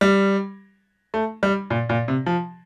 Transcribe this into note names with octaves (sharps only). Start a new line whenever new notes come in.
G3
A3
G3
A#2
A#2
C3
F3